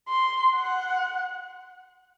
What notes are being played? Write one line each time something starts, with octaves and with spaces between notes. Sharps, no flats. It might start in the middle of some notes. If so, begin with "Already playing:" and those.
C6
F#5